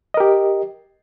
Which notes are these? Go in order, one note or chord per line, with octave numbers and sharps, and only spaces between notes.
G4 A#4 D#5